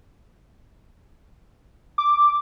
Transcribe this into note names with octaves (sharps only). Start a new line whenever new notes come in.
D6